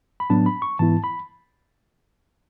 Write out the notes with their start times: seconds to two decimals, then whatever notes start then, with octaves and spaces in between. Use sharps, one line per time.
0.20 B5
0.30 A2 F#3 B3 D4 A5
0.46 B5
0.62 C#6
0.79 G#2 E3 B3 E4 A5
1.04 B5